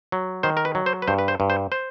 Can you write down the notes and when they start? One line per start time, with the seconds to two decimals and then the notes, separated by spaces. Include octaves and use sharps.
0.12 F#3
0.43 D#3 C5
0.57 A#4
0.65 B4
0.75 F#3
0.86 C5
1.02 B4
1.08 G2 C5
1.19 B4
1.28 C5
1.40 G2
1.50 C5
1.72 C5